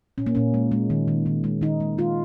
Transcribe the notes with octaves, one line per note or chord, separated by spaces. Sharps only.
A#2 C#4
A#3
A#2 C#4
G#3
G#3
D#3
D#3
D#3
G#3
D#3 D#4
G#3
G#3 F4